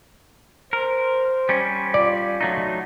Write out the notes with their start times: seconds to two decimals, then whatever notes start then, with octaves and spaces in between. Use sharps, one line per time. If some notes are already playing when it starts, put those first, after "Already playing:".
0.73 A#4 C5
1.49 G3 C#4
1.94 F4 D5
2.41 F#3 A3 D#4